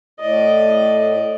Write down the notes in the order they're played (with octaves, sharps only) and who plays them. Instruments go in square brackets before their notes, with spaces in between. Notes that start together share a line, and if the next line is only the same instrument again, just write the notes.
[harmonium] A2 [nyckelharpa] D5 D#5